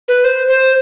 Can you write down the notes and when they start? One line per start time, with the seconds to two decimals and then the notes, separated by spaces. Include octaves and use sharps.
0.08 B4
0.24 C5
0.48 C5